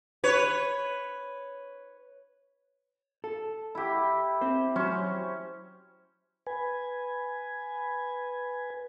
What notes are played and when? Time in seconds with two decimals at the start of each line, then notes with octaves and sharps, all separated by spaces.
0.24 B4 C#5
3.24 A4
3.75 E4 G4
4.41 C4 C5
4.76 F#3 C#4 C5
6.47 B4 G#5